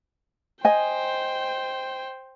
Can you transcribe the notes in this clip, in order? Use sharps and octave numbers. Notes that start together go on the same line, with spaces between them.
C5 D#5 G5 G#5